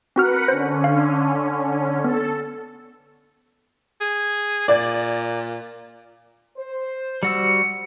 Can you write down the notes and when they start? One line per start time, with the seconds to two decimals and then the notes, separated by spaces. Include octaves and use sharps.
0.16 C4 F#4 A#4 B4 F#5 F6
0.48 D3 C#4 C5
0.84 F5
2.04 B3 A4
4.01 G#4
4.68 A#2 D5
6.57 C5
7.23 G3 F#4 E6 C#7